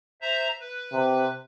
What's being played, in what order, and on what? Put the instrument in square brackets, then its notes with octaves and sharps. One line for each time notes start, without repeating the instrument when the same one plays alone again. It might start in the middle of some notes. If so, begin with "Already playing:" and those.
[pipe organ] C5 E5 A#5
B4
[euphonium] C3